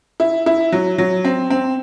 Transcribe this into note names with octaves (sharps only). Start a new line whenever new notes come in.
E4
E4
F#3
F#3
C4
C4